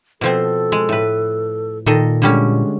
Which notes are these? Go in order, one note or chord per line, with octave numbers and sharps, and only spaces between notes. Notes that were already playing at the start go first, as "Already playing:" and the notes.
B2 F3 C4 A4
G#3
A2 B4
A#2 D#3 A4 D#5
D3 G3 G#3 C#4